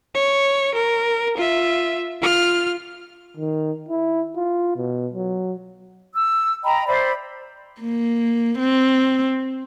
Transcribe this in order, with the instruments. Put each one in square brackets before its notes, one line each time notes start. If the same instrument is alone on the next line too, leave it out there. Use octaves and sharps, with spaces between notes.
[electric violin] C#5
A#4
F4 E5
F4 F6
[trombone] D#3
E4
F4
B2
F#3
[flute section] E6
D#5 G5 A#5 B5
C5 D5 E5 B5
[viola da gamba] A#3
C4